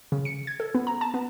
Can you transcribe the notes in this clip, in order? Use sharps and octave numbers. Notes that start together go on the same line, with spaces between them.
C#3
C#7
G#6
A4
B3
A#5
A5
B3